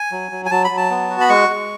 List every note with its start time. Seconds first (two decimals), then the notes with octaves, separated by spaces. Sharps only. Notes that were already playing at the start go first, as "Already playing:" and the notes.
Already playing: G#5
0.12 F#3
0.31 F#3
0.46 G#5
0.51 F#3 A5
0.65 B5
0.71 F#3
0.77 A5
0.91 B3
1.10 F#4
1.21 B5
1.29 G#3 C#6
1.49 G#3